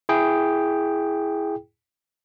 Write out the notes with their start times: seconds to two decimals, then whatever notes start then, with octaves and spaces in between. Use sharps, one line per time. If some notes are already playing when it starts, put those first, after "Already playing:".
0.09 E4 G#4 G5